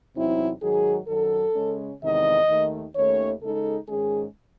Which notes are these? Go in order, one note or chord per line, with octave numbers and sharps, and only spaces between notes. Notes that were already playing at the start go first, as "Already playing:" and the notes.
E2 C3 F#3 C4 D#4 E4
G#2 D#3 F#3 G#4
F#2 D#3 F#3 A4
C#3 G#3 C#4
E2 C3 D#3 G#3 D#4 D#5
D#2 D#3 A3 D#4
D#2 D#3 A3 C#4 C#5
C#3 G#3 D#4 A4
G#2 D#3 G#3 C#4 G#4